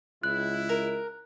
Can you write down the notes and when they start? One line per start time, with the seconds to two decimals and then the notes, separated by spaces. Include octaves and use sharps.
0.23 C#2 E4 F#6
0.69 A#4